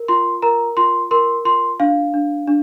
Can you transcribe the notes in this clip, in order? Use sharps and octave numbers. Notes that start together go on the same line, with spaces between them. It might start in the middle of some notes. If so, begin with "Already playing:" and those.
Already playing: A#4
F4 C6
A#4 A#5
F4 C6
A#4 C6
F4 C6
D4 F5
D4
D4